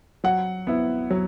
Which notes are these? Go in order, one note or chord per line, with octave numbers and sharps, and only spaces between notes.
F#3 F#5
B3 E4
F#3